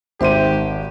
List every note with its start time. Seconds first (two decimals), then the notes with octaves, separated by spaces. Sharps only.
0.21 G#1 G4 C5 E5 C6 D#7